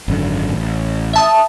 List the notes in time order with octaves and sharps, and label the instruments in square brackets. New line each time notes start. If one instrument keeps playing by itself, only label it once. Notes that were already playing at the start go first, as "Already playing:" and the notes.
[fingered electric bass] G#1 F#2 D3
A1
[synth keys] E5 A5 D#6